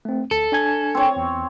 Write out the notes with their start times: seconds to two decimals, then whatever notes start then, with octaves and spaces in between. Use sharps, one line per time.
0.05 A3 C4
0.31 D2 A4
0.52 D4 G#5 G#6
0.95 C4 C#5
1.16 E2